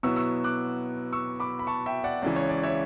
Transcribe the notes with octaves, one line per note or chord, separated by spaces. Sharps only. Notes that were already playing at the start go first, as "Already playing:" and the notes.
B2 F#3 B3 E4 C#6 E6
C#6 E6
D6 F#6
C#6 E6
B5 D6
B5
A5 C#6
E5 G5
D5 F#5
C#2 C#3 E3 D5
C#5
D5
C#5 E5